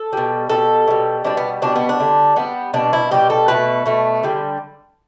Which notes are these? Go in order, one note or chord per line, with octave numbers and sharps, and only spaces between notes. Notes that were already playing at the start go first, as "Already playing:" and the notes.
Already playing: A4
B2 G3
B2 G3 A4
B2 G3
B2 G3 D4
B3
B2 G3 D4
B3
D4
D3 G3
D3 G3 B3
B2 G3 D4
E4
B2 G3 G4
A4
B2 A3 B4
B2 A3
D3 G3